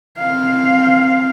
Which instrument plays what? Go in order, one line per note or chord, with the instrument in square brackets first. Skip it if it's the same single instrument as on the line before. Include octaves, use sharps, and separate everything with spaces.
[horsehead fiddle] C4 F5